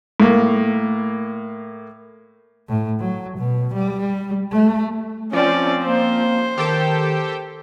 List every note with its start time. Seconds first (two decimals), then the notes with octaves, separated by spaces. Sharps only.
0.20 A2 A#3
2.69 A2
3.00 F#3
3.38 B2
3.74 G3
4.51 A3
5.33 F3 C4 C#4 D5
5.85 A#3 C5
6.58 D#3 G4 A4 G5